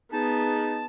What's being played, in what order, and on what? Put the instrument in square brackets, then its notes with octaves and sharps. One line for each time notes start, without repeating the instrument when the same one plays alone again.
[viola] B3 [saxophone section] D#4 G#4 [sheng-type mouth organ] A5